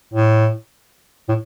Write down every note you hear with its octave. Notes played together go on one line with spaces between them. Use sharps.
A2
A2